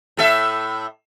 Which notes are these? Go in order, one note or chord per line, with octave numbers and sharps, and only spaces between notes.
A2 A4 E5